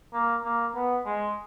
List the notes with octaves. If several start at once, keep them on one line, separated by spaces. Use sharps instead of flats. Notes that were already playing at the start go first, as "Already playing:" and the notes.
A#3
A#3
B3
G#3